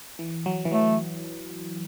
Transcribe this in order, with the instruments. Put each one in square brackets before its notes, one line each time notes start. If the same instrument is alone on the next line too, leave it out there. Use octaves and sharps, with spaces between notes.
[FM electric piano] E3
F#3
E3
[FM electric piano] F#3 [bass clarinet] A3